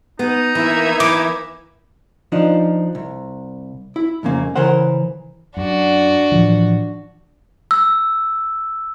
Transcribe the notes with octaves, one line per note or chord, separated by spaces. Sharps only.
B3 D#4
E3 A#3 E5 G#6
E3 D6
F3 D4 D#4
C2
E4
C2 F2 C#3 A#3
C#3 E3 A#4 C5 F#5
F#2 D4 F#4
A2 E3 F3
E6